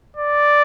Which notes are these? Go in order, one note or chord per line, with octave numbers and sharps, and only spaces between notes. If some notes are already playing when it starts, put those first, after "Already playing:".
D5